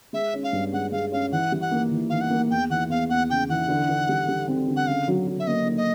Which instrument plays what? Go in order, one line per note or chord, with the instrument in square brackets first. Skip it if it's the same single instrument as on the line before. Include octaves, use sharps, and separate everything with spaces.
[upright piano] G#3 [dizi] E5
[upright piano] C#4
[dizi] F5
[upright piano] G2
[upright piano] G#3 [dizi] F#5
[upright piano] G#3 [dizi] F5
[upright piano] C#4 [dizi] F5
[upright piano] E3 [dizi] F#5
[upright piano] G3
[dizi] F#5
[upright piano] A#3
E3
[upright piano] E3 [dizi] F5
[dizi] F#5
[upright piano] A#3
[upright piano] E2 [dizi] G5
[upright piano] E3 [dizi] F#5
[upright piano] E2 [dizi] F5
[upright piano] E2 [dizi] F#5
[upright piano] C#3 [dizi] G5
[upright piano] E3 [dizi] F#5
[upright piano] D3
D3
G3
G3
C4
D3
[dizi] F#5
[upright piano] C#3 [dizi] F5
[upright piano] F#3
F#3
[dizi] E5
[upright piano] A#3 [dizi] D#5
[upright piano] A#3
[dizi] D#5